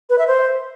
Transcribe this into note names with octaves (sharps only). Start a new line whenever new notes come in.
B4
E5
C5